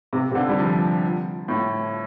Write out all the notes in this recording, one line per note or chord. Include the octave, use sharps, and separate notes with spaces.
C3
C3
D3
G3
F3
A2